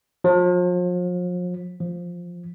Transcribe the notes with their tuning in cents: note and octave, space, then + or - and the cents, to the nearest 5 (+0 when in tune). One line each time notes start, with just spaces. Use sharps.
F3 +40
F3 +5